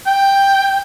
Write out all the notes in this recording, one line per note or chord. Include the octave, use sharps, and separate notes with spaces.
G5